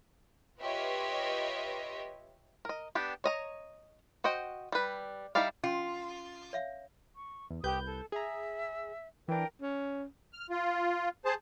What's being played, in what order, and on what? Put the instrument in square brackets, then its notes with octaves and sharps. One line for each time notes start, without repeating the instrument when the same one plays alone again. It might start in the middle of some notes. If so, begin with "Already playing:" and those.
[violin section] F4 G4 B4 C#5 D#5 E5
[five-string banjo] A#4 D#5
B3 D4 G4
C#5 D#5 A#5
F#4 C5 D#5 G5
G3 B4
G3 D#4 E4 D5 F5
[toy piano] C#4 C6 [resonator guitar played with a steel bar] F4
[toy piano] C#5 E5 F5
[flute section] C#6
[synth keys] E2
[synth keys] C2 B4 G6 [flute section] G4 D#6
[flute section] A4
[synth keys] G#4 A#5 [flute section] E5
[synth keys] E3 D4 [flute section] A#4 G5
[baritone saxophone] C#4
[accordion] F6
F4
G#4 C5 A5